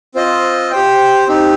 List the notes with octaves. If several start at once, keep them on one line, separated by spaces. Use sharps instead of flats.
C4 F4 C5 D#5
G4 C5 G5
C4 D#4 G4